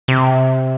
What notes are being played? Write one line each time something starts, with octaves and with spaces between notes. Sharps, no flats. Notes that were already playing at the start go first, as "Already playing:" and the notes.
C3